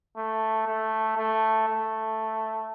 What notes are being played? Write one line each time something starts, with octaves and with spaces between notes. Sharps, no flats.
A3
A3
A3
A3